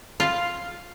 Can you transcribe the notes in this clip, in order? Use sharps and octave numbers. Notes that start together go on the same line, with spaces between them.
F4